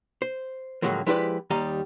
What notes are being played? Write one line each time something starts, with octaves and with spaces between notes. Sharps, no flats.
C5
A2 D3 F3 F#3 G#3 A#3
F3 G#3 E4 G4 B4 D5
D#2 G3 D#5 F5 A#5